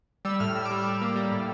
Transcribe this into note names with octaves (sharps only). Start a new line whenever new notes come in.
G3 E6
A2 F6
A2 E6
D6
G3
E6
G3
A#3
G3
A2